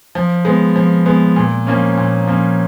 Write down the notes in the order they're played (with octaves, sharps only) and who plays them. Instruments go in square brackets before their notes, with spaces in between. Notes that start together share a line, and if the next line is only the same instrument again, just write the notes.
[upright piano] F3
G#3 B3
F3
G#3 B3
A#2
F3 A#3 C#4
A#2
F3 A#3 C#4